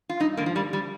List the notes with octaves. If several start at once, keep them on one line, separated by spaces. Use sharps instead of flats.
F4
G2 D#4
D3 A#3
F3
D3 G3
G3